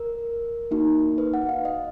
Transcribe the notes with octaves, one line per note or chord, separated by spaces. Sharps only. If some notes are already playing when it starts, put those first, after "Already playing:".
Already playing: A#4
A#3 D#4 F#4
B4
F#5
F5
D#5